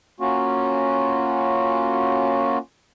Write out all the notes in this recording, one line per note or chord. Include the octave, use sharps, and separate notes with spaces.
A#3 C#4 F4 F#4